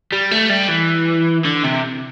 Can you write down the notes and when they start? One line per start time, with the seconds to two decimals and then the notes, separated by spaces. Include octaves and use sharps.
0.12 G3
0.31 A3
0.50 G3
0.69 E3
1.45 D3
1.64 C3